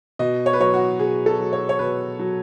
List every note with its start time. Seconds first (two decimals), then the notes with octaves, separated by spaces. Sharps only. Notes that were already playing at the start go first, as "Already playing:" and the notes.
0.19 B2 D#5
0.46 C#5
0.53 B4
0.60 F#3 C#5
0.73 F#4
0.99 B2 G#4
1.26 A4
1.39 F#3
1.53 C#5
1.69 C#5
1.79 B2 B4
2.19 F#3